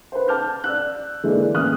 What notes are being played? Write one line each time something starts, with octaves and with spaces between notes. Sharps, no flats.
B4 C5
A5 D6 F6 G6
D5 E6 F#6
D3 E3 G#3 A#3 D4
A1 D#2 E3 D#6 F6 F#6